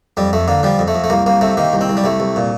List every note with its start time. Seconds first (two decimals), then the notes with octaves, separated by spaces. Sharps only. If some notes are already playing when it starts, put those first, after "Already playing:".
0.17 F2 G3
0.33 F2 A3
0.48 D3 A#3
0.63 F3 G3
0.79 F2
0.88 A3
0.95 F2
1.04 A3
1.10 C2 A#3
1.26 C2 A#3
1.41 C3 A3
1.57 D#3 A#3
1.73 C2
1.81 C4
1.89 C2
1.97 G3
2.04 C2 A3
2.20 C2
2.36 A#2